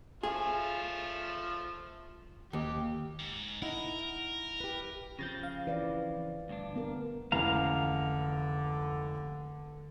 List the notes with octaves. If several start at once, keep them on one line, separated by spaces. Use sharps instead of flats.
F3 A3 F4 G#4
D#2 G4
G#2
D#4 E4 A#4 F#5
G4 B4
C#3 F3 C4 G6 A6 A#6
F5
E3 B4 D5 F5
D2 G2 D4
B3 A#4
F1 C#2 D3 E3 F5 A#5